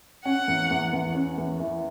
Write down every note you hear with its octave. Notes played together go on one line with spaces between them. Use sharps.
C#4 F#5
E2
E2
E2
C#4
E2
E3